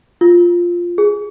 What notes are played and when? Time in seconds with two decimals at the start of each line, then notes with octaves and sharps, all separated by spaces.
0.21 F4
0.98 G#4